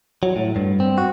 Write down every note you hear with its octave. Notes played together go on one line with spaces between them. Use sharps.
F#3
A2
G2
C4
F#4